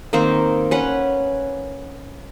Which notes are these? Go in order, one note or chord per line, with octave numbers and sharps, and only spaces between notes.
D#3 A#3 C4 C5
C#4 B4 F#5